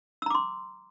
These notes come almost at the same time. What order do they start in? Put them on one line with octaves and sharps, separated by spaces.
E6 A#5 D6 C6